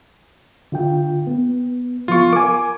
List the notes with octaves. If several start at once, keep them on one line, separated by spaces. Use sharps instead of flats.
D3 F4 G5
B3
F3 B3 F4 C#6
A#4 G#5 D6